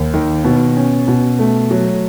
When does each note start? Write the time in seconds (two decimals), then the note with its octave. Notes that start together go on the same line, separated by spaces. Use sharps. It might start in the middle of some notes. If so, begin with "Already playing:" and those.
Already playing: D#2
0.14 D#3
0.44 B2
0.77 C#4
1.08 B2
1.39 A3
1.71 F#3